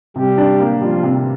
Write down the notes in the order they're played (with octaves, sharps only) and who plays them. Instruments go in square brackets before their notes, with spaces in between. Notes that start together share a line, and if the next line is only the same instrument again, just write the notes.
[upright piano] C3 [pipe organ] G3 G4
[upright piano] D4
A#3
[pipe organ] F3 F4 [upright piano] G3
[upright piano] C3